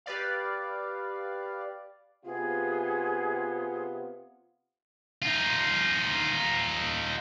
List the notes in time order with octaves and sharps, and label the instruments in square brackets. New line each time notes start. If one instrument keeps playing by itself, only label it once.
[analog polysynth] G4 B4 D5 F5
[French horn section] C3 B3 F4 [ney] G#4
[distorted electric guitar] D#4 F4